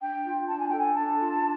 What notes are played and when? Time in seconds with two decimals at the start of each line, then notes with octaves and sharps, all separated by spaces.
0.01 D4 G5
0.25 F4
0.48 D4 A5
0.58 G#5
0.69 A4 G5
0.79 G#5
0.95 D4 A5
1.18 F4
1.41 D4